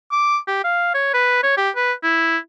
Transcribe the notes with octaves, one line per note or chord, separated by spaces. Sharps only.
D6
G4
F5
C#5
B4
C#5
G4
B4
E4